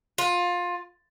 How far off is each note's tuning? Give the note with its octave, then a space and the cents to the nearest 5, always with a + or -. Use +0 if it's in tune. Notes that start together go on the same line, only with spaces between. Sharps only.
F4 +20